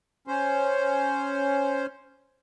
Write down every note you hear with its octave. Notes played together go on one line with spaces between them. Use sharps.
C#4 C5